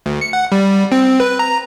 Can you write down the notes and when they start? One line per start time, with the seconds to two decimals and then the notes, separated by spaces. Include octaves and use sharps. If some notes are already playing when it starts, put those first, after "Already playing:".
0.06 D2
0.21 C#7
0.33 F#5
0.52 G3
0.92 C4
1.20 B4
1.39 A#5